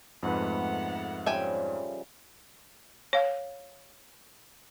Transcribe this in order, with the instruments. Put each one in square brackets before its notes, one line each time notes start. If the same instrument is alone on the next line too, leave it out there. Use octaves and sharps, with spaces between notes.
[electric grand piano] F2 G#2 B4 [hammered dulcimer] A3 [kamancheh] B3 F#5
[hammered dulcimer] C#3 F3 G3 [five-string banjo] E5 G5 G#5
[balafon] C#5 F5